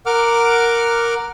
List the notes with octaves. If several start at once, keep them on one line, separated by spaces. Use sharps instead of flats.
A#4 F#5 D6 F6